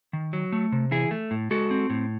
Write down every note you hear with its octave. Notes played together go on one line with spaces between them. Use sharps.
D#3
F#3
A3
C3
E3 E4 G#4
A3
A2
G#3 F#4 A4
C4
A2